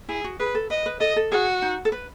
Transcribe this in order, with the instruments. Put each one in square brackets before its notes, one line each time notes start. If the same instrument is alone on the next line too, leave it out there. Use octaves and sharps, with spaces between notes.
[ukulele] E4 [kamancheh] G#4
[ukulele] F#4
[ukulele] G#4 [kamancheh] B4
[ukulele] A4
[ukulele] B4 [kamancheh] D#5
[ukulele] B4
[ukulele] A4 [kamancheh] D#5
[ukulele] A4
[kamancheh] F#4 [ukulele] G#4
[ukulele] D#4
A4
B4